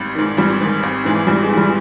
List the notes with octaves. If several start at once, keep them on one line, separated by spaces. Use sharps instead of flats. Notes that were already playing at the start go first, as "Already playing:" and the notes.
Already playing: G#1 G3
G#2 D#3
G#1 G3
G#2 D#3
G#1
G#2 E3
G#1 G3
G#3
G#2 E3
G3